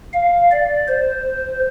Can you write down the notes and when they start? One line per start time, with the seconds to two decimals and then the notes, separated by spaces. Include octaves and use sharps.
0.13 F5
0.51 D5
0.88 C5